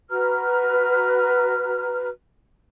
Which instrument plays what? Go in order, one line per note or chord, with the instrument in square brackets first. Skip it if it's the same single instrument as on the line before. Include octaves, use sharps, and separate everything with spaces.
[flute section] F#4 B4 A#5 F6